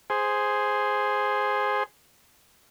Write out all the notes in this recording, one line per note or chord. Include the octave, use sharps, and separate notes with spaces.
G#4 C5